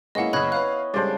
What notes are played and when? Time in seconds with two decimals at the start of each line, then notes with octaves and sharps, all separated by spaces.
0.15 G#3 A#3 B3 C#4 E4 D#5 F#5
0.33 F#1 C#3 C#4 E4 D#5 B5 F#6 G#6
0.52 B4 C#5 F5 F#6
0.94 C#3 G3 G#3 D4 A4 C5 D5